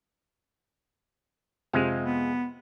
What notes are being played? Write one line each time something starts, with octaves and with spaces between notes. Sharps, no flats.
F2 C3 G#3 F5
B3